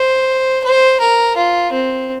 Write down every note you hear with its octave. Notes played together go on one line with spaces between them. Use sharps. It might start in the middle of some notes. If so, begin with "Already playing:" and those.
Already playing: C5
C5
A#4
F4
C4